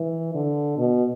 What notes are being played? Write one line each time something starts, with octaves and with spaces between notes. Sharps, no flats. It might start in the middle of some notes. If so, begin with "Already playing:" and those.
Already playing: E3
D3
B2